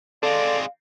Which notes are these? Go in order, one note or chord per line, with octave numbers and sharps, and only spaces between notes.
G#3 C4 A4 D5 F5